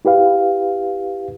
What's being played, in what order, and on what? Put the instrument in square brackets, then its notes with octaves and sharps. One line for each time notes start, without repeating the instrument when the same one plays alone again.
[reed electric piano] E4 G4 B4 F5